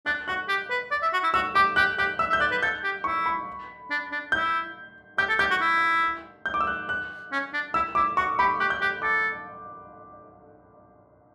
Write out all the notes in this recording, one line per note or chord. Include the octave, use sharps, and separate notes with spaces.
D4 F#6
F#4 F#6
G4
B4
D5
E5
F#4
E4
F#4 E6
G4 D6
G4 F#6
G4 F#6
E5 E6
E5
G6
D5 F#6
B4
A4 G6
G4
E4 C#6
B5
D4
D4
E4 G6
G4 G6
A4
G4 G6
F#4
E4
G6
D6
E6
F#6
F#6
C#4
D4
E4 E6
E4 D6
F#4 C#6
G4 B5
G4 F#6
G6
G4 F#6
A4 D6